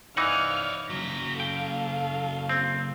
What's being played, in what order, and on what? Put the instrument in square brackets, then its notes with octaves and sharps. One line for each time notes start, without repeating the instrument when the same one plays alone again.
[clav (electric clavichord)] E3 D#4 F#5 [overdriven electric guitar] C#5 D5 [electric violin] F5 F6
[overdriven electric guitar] C#3 F#3 [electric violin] A#6 B6
[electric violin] A4 F5 [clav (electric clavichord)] G5
[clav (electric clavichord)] C4